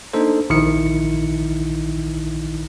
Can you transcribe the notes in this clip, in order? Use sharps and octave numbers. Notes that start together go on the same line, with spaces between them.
A#3 D4 D#4 A4 C5
A#1 D#3 D#4 E4 C#7